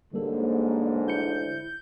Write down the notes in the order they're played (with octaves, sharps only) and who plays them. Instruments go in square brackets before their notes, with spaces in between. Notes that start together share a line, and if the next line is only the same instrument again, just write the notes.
[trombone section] A1 G#2 [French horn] D3 [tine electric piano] G3 A4 [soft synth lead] A#3
[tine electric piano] E4 C#7 [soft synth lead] G6